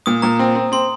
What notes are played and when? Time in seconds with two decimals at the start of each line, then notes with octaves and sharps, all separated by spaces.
0.06 A#2 D#6
0.22 A#2 A#5
0.39 C4
0.55 C4
0.72 C4 C6